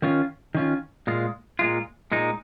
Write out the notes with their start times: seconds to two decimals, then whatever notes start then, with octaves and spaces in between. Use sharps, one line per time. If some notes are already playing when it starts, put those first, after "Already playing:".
0.02 D#3 C#4 F4
0.54 D#3 C#4 F4
1.07 A#2 G#3 F4
1.59 A#2 G#3 F4
2.12 A#2 G#3 D#4